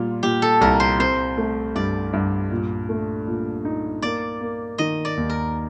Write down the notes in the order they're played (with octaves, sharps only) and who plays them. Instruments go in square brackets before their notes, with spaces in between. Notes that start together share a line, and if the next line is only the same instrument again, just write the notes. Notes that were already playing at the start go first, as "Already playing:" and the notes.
Already playing: [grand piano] A#2 G3 [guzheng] F4
[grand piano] A#2 [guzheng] G4
[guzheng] A4
[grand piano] C2 [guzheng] A#4
[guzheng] C5
[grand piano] C4 [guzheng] C5
[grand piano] A3
[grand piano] G2 [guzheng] D5
[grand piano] G2
A#2
A3
A#2
D#4
[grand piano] A#3 [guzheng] D5
[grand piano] A#3
[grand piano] D#3 [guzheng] D#5
[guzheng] D5
[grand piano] D#2
[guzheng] A#4